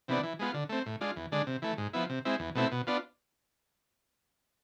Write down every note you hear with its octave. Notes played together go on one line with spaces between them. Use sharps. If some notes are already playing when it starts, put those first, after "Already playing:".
C3 E3 B3 D4
E3
G#3 B3 F4
D3
A3 C4
A2
G#3 D4 F4
E2
D3 G#3 D4
C3
E3 A3
G#2
F3 B3 E4
C3
G#3 C4 E4
E2
B2 A3 C4 E4
B2
B3 D4 F4